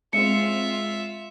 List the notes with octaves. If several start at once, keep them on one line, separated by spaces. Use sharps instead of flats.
G#3 C4 F4 E5 C#7